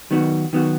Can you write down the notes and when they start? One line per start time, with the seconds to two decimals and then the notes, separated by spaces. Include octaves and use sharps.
0.11 D#3 F#3 B3 F#4
0.53 D#3 F#3 B3 F#4